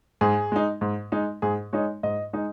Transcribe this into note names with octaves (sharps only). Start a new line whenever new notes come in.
G#2 G#4
G#3 D#4
G#2
G#3 D#4
G#2 G#4
G#3 D#4 C#5
G#2 D#5
G#3 D#4